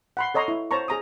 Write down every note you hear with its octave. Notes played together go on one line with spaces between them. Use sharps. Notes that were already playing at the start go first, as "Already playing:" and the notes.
F#5 B5 C6
A4 C#5 D#5 A#5 C6
E4
C5 C#5 A5 A#5 C#6
G#4 A#5 D#6